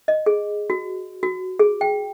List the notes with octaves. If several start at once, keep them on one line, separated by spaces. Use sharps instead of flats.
D#5
G#4
F#4
F#4
G#4
G5